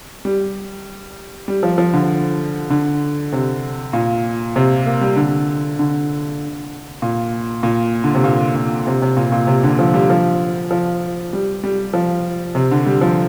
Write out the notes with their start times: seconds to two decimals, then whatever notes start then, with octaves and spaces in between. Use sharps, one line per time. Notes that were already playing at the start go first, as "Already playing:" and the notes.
0.25 G3
1.48 G3
1.63 F3
1.78 F3
1.93 D3
2.70 D3
3.33 C3
3.93 A#2
4.56 C3
4.86 A#3
5.01 G3
5.16 D3
5.79 D3
7.02 A#2
7.63 A#2
8.04 D3
8.15 C3
8.24 A#2
8.56 A#2
8.87 C3
9.02 C3
9.17 A#2
9.32 A#2
9.47 C3
9.64 D3
9.79 F3
9.94 G3
10.10 F3
10.71 F3
11.33 G3
11.64 G3
11.94 F3
12.55 C3
12.71 D3
12.86 G3
13.01 F3